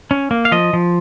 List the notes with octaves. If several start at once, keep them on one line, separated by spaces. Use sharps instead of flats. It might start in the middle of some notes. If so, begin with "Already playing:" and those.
C#4
A#3
F5
F3 D#5
F3